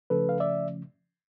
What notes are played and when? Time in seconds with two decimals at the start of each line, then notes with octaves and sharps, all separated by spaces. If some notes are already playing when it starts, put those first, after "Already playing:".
0.10 C#3 F3 A3 C#4 A4 B4
0.29 F5
0.40 D5 E5